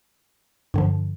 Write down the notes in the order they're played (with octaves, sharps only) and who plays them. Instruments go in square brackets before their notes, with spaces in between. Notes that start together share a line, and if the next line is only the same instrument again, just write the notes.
[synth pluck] G2 D3 F3